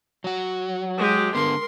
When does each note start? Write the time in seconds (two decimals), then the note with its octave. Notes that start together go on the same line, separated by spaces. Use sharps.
0.24 F#3 F#4
0.98 G#3 G4
1.35 D3 B3 A#4 C6